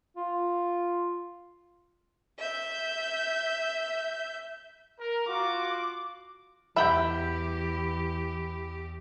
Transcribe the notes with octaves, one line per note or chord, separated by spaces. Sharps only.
F4
E5 G6
A#4
F4 F#4 D6
E2 E3 G4 E5 F#5 G5 B5 G6